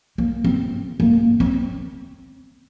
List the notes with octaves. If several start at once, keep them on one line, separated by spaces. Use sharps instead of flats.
A#3
C4
A#3
C4